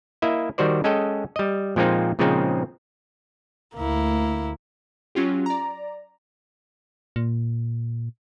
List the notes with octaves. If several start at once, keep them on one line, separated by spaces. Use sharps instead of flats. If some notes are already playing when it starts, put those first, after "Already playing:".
A#3 E4 D#5 E5
D#3 G3 F#4 C5 D5
G#3 C#4 A4 D#5 G5
G3 D#5
A#2 F3 G#3 A#3 C4 D#4
A#2 C#3 F3 G#3 C4 D#4
D2 A#3 E4
F#3 C#4 F4 G4
D5 A#5
A#2